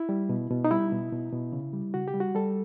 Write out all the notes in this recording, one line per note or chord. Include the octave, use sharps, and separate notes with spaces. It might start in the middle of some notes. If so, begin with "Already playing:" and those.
Already playing: E4
G3
B2
B2
D#4
G3 E4
B2
B2
B2
C#3
G3
C#3 F#4
G4
G3
F#4
G3 A4